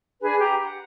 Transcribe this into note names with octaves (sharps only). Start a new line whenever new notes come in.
D4 G#4 B4 G#5
G4 A#5
F#5